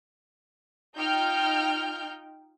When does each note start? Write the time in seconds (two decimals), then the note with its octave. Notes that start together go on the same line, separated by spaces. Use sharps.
0.98 D#4 F4 G5 F6 G6